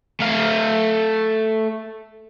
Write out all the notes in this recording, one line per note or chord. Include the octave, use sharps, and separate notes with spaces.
A3 F5